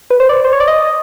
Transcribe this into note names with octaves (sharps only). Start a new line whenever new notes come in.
B4
C5
D5
C5
C#5
D5
D#5